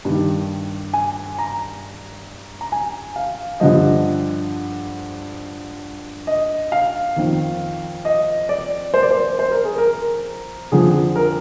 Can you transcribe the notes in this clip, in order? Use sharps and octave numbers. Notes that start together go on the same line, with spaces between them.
G2 D#3
G#5
A#5
A#5
G#5
F5
G2 D3 F3 D#5
D#5
F5
F2 D#3
D#5
D5
C5
D5
C5
C5
A#4
G#4
A#4
F2 D3 F3 G#4
A#4